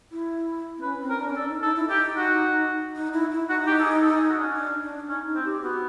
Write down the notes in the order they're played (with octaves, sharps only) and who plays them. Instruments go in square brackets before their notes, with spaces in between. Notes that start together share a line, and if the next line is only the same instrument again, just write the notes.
[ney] E4
C4
[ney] C#4 [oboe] B4
[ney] C4
[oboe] A#4
[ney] C#4
D4
C#4
[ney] D4 [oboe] A4
[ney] D#4
[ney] D#4 [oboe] A4
[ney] E4
[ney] D#4 [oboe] G4
[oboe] F#4
[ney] D#4
E4
E4
[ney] D#4 [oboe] F#4
[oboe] G4
A4
G#4
A4
G#4
F#4
D4
C#4
[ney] D4
D4
[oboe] C#4 [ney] D#4
[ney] D#4
[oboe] C4
[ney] G4
[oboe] B3 [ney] F#4